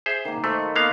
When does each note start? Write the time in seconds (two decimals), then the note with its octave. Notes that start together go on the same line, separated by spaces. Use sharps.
0.06 G#4 C5 E5
0.25 D#3 A#3
0.44 A3 A4 C5 D#5
0.76 A#3 B3 F5